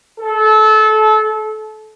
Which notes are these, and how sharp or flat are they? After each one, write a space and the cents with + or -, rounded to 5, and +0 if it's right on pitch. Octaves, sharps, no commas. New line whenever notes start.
A4 -25